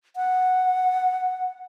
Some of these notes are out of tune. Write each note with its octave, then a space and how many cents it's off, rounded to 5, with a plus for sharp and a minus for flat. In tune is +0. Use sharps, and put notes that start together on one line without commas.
F#5 -5